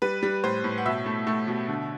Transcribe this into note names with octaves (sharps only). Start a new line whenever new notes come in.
G3 B4
G3
A2 C5
A2
F#5
B2 E5
A3
A3
B2
D3